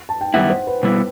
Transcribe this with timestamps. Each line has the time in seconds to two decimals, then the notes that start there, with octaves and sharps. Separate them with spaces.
0.09 A5
0.21 G5
0.34 F#2 D#3 G3 B3 E4 F#5
0.50 C5
0.67 B4
0.83 B2 G3 B3 E4